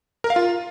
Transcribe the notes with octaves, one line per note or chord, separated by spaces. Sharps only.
A#4
F5
F4